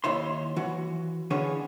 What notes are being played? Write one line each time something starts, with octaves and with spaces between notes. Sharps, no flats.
D#2 E4 C#5 C6
E3 F#4
D3 E3 C#4 D4 G#4 C#5